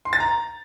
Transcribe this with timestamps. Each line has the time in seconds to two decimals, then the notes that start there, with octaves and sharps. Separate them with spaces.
0.05 C6
0.13 A6
0.20 A#5